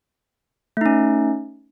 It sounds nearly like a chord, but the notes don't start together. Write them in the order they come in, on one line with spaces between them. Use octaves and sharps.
A3 D#4 C#4